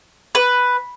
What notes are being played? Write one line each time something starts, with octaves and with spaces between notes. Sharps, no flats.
B4